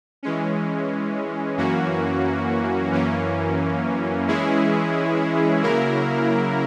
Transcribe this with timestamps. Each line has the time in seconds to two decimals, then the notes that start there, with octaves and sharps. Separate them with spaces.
0.23 E3 G#3 C#4
1.57 F#2 E3 A#3 C#4 F#4
2.92 F#2 E3 A#3 C#4
4.27 E3 G#3 C#4 E4 G#4
5.63 C#3 F#3 A#3 E4 A#4